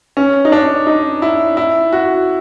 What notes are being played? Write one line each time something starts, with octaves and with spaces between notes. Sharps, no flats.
C#4
D#4
D4
D#4
E4
E4
F#4